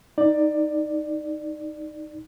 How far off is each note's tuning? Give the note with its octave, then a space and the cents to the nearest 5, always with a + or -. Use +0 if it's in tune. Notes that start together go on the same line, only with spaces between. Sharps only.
D#4 +0 D5 +15